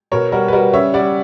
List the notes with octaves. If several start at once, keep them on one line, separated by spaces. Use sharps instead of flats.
B2 A#4 C#5
G3 F#4 A#4
B4
G3 F#4 A#4
C#3 C#5 E5
G3 D5 F#5